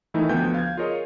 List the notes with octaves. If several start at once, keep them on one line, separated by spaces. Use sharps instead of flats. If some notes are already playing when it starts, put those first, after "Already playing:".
D#3 E3 A3 D#4 E4
D2 F3 B3 G5 G6
F5 G#6
F4 G#4 A#4 C#5 D#5